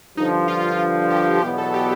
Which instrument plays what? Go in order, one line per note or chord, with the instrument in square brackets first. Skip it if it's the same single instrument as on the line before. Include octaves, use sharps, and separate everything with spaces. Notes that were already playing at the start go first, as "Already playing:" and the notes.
[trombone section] G2 D3 F3 [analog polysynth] D#4
[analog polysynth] F4
G4
[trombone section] E2 B2 F#3 B3 [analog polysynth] G4
[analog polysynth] A4
G4